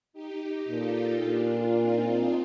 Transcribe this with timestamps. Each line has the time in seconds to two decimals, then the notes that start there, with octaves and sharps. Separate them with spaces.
0.13 D#4 G4
0.69 A#2 F4 A4
1.24 A#2 D4 F4
1.80 C4 D#4